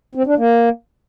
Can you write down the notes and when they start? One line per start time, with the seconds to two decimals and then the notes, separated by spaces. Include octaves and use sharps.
0.15 C4
0.26 D4
0.38 A#3